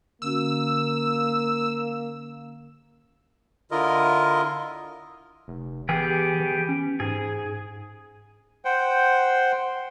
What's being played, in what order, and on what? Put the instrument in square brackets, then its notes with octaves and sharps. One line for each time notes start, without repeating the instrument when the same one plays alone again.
[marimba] D3 C#4 F#4 [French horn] A#3 [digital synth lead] E6
[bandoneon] D3 E4 F4 A#4 D#5
[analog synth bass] F1
[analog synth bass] E3 [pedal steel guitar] B3 G4 G#4
[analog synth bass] E3
C#4
[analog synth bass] G#2 [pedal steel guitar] G#4
[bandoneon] C5 F#5 G5